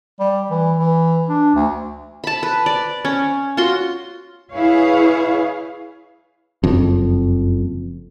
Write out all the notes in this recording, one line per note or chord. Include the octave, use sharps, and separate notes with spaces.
G3
E3
E3
D4
D2
A5 B5
B4
D5
C#4
F4 F#4 C6
E4 G#4 B4 C#5 F5
F#1 F2